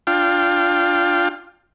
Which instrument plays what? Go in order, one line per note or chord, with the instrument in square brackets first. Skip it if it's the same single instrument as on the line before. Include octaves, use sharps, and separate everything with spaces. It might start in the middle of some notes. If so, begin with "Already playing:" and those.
[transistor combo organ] D4 F4 F5 G5